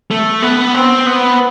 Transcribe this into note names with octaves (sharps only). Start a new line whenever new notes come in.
A3
B3
C4
B3